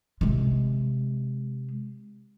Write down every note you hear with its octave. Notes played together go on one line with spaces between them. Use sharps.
C3 G#3